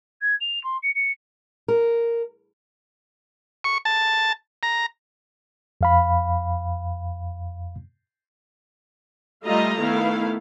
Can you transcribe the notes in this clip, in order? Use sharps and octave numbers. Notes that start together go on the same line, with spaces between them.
G#6
F7
C6
C#7
C#7
A#4
C#6
A5
A#5
F2 F5 B5
G3 A3 F4 D#5 E5 A#5
D#3 A3 B3 E4 F5